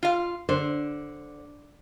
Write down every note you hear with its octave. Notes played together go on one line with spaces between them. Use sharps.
F4 F5
D3 C5